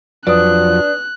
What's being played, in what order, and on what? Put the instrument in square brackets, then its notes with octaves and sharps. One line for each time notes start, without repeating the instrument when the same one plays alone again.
[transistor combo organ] F2 F3 F#3 [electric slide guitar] D4 D5 [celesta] B4 D#6 [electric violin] F#6